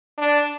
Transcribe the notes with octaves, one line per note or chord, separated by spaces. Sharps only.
D4